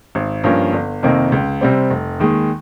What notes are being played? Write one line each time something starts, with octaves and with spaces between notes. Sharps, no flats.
G#1
G2 F3 A#3 C#4
G1
F2 C3 D#3 A#3
C#2
C3 G3 C4
F1
D#2 D#3 G#3